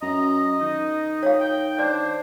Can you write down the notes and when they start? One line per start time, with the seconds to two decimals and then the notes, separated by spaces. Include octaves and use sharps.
0.02 F#2 D#5 A#5
0.61 D#3 D#4
1.23 C#5 F5
1.40 G5
1.79 D4 C5 D5